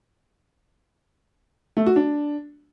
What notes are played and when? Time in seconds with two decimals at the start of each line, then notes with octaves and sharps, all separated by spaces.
1.77 A3
1.86 F#4
1.96 D4